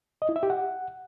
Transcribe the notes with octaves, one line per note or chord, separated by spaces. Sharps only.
D#5
E4
E5
G4
F#5